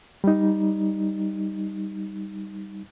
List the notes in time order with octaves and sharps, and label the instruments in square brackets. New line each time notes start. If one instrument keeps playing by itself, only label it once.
[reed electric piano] G3 D#4